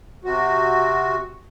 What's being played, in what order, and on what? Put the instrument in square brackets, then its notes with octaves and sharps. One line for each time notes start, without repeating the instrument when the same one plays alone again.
[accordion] C3 F#4